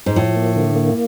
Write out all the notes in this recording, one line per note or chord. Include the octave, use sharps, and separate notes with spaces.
G#2
A2 F3
A#3
D3
A#3